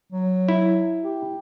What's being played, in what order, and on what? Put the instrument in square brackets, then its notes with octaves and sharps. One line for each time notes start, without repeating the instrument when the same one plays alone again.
[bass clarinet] F#3
[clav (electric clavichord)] E4
[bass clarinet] G4